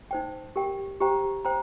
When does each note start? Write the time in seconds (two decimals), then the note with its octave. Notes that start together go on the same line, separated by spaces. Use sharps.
0.11 D#4 C5 G5
0.56 G4 A#4 G5
1.00 G4 C5 G5 A#5
1.45 C5 G5 A#5